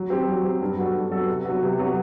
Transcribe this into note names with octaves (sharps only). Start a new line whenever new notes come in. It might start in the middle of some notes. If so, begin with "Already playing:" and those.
Already playing: F#3
C4 G4
F#3
C4 G4
G2
F#3 B3 F#4 A4
G2
F#3 B3 F#4 A4
C3
F#3 B3 F#4
C3
F#3 B3 F#4